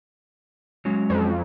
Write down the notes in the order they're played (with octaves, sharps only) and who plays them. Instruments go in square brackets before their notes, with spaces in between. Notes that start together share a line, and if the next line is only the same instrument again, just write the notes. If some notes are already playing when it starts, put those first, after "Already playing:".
[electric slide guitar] F#3 G#3 C#4
[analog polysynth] F2